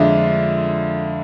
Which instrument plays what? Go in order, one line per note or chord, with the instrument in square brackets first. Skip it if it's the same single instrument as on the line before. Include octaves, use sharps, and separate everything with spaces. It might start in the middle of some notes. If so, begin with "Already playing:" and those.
Already playing: [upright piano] F2 D3 G#3 D4 F4 [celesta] E5